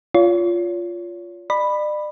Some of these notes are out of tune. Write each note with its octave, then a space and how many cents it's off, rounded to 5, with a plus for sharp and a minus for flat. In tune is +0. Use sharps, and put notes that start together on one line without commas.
F4 +0 C#5 +40
D5 +40 B5 +0